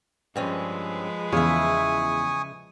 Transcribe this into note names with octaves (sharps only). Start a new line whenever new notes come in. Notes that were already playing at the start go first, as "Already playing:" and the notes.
G2 F3 G#3 C4 C#4 B4
E2 C#3 E5 G#5 C#6 D#6